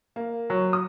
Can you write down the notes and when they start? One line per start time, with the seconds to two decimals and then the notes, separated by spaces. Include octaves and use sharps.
0.16 A#3
0.50 F#3
0.73 D#6